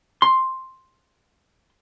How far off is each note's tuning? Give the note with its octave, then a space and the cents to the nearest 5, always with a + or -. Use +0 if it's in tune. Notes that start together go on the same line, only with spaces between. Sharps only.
C6 +5